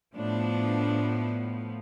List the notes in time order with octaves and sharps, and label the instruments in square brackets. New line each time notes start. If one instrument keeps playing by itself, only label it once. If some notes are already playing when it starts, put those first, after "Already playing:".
[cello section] A2 F3 B3 D4